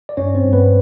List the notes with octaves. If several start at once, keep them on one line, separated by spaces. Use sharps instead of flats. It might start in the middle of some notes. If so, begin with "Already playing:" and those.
D5
G2 C#4 C#5
C4 C5
G2
B3 B4